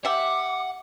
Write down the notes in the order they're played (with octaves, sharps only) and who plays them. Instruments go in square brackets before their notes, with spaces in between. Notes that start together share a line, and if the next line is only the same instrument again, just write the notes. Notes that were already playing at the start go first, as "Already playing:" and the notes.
[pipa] G4 E5 [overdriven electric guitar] F#5 [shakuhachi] D6